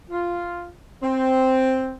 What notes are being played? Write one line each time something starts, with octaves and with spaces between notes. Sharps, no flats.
F4
C4